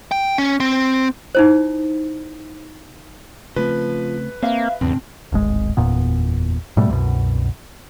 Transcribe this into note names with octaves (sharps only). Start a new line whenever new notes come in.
G5
C#4
C4
D#4 E4 C5
C#3 F3 A3 C4 B4
A#3 C4 C5 E5 F5
E2 G#2 C#3 C4 D4
D1 G#1 G#3
F#1 E2 A#2 B3
G#2 B2 G3 A3
C2 F#2 B2